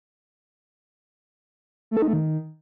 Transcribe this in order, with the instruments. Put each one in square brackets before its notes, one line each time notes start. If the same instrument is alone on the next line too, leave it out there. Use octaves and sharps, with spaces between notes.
[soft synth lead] A3
A4
D#4
A3
D#3